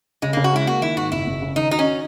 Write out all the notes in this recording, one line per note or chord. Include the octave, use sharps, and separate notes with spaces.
C#3 G#3
C#3 A#3
F#4
G#3 E4
A#3 F#4
D#3 E4
G#2 F#4
F#1 E4
F#1
C#3
D#3 D#4
D#4 F#4
C#4
D#4